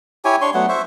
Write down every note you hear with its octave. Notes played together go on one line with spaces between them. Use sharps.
E4 G4 C#5 G#5
D4 C#5 C6 C#6
F#3 A3 B3 F#5
C5 E5 C#6